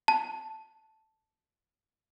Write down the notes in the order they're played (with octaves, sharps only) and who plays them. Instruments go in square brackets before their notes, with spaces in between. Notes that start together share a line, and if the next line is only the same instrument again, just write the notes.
[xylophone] A5